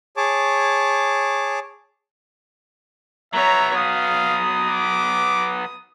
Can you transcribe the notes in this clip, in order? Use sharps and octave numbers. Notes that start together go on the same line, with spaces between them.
G#4 C#5 A5 D6
F#3 B3 C#5 E5 A#5
F5 D#6
D6